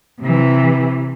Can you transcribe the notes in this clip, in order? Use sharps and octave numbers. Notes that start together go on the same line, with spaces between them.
C3 E3